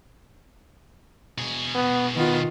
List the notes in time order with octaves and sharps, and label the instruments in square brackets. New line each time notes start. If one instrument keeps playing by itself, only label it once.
[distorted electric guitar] B2 G#4
[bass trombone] B3
[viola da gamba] D#3 F4 [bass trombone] B3